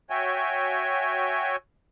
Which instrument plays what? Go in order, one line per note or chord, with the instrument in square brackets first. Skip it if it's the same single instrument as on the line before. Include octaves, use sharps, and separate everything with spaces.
[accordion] F#4 C#5 E5 G5 G#5